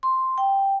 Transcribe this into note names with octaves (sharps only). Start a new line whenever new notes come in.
C6
G5